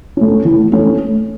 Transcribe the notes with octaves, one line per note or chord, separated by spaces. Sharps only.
A3 C#4
E3
A3 C#4